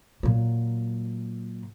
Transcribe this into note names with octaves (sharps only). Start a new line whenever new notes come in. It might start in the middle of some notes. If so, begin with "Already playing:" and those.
A#2 F#3